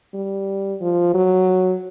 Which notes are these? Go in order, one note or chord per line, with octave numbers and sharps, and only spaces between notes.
G3
F3
F#3